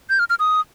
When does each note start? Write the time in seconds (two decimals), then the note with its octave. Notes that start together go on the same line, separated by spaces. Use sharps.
0.10 G6
0.19 F6
0.30 F6
0.40 D#6